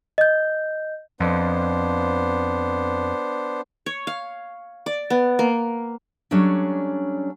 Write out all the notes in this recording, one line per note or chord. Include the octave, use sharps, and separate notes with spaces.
D#5 G6
F2 B3 D4 C5
C#5
F5
D5
B3
A#3
F#3 G3 A3 C#4 D4